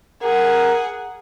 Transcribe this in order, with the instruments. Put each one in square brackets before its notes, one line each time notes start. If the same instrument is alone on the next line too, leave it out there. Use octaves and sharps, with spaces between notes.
[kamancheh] G#4 F#5 [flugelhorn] A#4